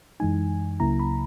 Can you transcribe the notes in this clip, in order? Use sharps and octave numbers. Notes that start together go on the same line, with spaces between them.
F#2 E3 G#3 D#4 G#5
C#2 C#3 F#3 A#3 E4 A#5
B5